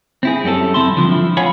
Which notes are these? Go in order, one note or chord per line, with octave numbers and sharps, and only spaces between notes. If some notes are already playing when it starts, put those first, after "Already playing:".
C4 E4 G#4
F#2 G3 C#4 A4 A5
F#3 C4 E4 A5 C6
G2 A#2 D3 F3
F3 E4
C#5 F5 F#5 G#5 B5